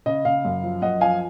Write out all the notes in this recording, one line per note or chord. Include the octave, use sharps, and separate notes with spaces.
C#3 D#5
C#3 F5
F#2
F3
F#2 D#5 F#5
F3 F5 G#5